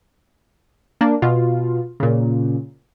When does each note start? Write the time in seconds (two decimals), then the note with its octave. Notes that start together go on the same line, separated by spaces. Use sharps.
1.01 A#3 D4
1.22 B2 F4
2.00 A#2 C#3